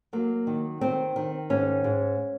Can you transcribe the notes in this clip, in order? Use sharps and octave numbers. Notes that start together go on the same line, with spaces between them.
F#3 A#3
D#3
D#3 C4
D#3
G#2 C#4
G#2